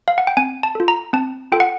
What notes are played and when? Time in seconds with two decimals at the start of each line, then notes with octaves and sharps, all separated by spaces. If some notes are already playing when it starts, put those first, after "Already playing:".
0.08 F5
0.18 F#5
0.27 G5
0.37 C4 G#5
0.63 A5
0.75 F4 A4
0.88 A#5
1.13 C4 A5
1.52 F4 A4 G5
1.60 F#5